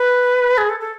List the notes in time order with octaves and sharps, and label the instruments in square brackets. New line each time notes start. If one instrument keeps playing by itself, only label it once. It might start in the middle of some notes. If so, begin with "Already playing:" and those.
Already playing: [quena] B4
G#4
A4
A4